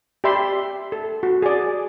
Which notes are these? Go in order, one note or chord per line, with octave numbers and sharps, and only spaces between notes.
G4 D5 E5 B5 C6
A4
F#4
G#4 D5